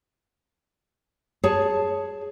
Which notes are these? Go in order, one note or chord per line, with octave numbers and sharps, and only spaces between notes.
G#4 C#5 A5